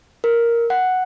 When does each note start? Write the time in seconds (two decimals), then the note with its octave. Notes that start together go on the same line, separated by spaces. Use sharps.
0.24 A#4
0.70 F#5